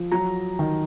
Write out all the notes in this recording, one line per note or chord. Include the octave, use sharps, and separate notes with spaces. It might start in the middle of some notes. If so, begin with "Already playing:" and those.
Already playing: F3
F#3 A#5
D#3